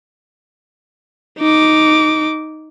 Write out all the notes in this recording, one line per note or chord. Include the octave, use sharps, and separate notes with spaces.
D#4 D6